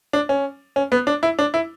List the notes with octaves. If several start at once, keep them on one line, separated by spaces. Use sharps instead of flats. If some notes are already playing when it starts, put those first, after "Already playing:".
D4
C#4
C#4
B3
D4
E4
D4
E4